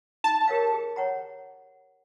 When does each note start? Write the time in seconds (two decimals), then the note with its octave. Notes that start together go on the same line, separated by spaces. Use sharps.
0.24 D#4 A5
0.48 G4 A#4 C#5 F5
0.73 G#4
0.96 C#5 F#5 A#5